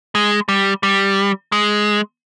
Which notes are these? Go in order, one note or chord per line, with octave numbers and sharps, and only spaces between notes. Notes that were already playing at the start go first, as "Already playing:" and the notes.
G#3
G3
G3
G#3